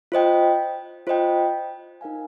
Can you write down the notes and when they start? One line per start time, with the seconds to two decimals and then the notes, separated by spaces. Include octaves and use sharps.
0.12 F4 C5 D#5 G5
1.07 F4 C5 D#5 G5
2.01 D#4 A#4 F5 G#5